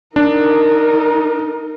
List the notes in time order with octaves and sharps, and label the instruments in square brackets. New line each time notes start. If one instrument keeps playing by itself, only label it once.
[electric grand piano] D4 [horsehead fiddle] D#4 A#4